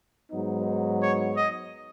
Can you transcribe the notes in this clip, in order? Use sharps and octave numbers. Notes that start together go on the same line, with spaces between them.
G#2 F#3 B3 D#4
C#5
D#5